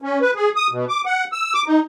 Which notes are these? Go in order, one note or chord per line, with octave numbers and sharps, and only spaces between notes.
C#4
B4
G#4
D#6
B2
D6
F#5
E6
D6
D#4